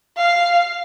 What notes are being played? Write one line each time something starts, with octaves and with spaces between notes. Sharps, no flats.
F5